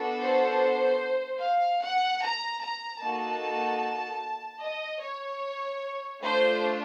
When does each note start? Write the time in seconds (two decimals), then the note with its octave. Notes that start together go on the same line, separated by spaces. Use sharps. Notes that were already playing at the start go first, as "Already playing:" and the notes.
Already playing: B3 D4 F#4 A4
0.21 C5
1.40 F5
1.81 F#5
2.21 A#5
2.61 A#5
3.01 A#3 D#4 F#4 A4 A5
4.62 D#5
5.02 C#5
6.22 A3 D4 F4 C5